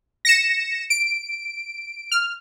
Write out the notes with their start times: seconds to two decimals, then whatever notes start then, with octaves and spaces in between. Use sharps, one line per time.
0.25 A#6 C#7 E7
0.90 D7
2.11 F6